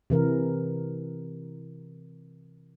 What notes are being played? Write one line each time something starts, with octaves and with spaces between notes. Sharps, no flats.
C3 E3 A#4